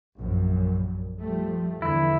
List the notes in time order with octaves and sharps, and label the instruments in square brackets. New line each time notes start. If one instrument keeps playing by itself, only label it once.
[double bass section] A#1 F#2
F3 G3 A3
[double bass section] E2 D3 [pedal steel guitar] E4